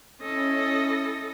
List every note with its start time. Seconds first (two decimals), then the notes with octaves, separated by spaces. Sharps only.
0.22 C#4 E4 A4 D#5